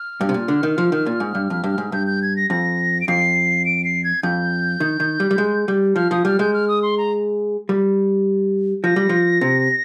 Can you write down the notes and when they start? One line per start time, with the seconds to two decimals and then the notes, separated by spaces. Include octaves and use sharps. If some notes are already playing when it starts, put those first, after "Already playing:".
Already playing: F6
0.21 G2
0.29 C3
0.34 A#2
0.48 D3
0.63 D#3
0.78 F3
0.92 D#3
1.06 A#2
1.20 G#2
1.35 G2
1.50 F2
1.64 G2
1.78 G#2
1.92 G2 G6
2.07 G6
2.22 G#6
2.36 A#6
2.50 F2 A#6
3.01 D7
3.08 F2 C7
3.65 D7
3.85 C7
4.04 G#6
4.23 F2 G6
4.80 D#3
5.00 D#3
5.20 G3
5.31 G3
5.38 G#3
5.68 G3
5.96 F3 F6
6.11 F3 D#6
6.25 G3 F6
6.39 G#3 G6
6.54 F6
6.68 D#6
6.82 C6
6.98 A#5
7.69 G3
8.84 F3 A#6
8.96 G3
9.09 F3
9.41 C3